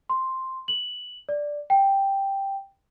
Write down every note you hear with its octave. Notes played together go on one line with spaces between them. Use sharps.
C6
F#7
D5
G5